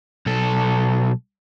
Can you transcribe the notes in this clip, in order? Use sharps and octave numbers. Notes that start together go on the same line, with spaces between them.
B1 A4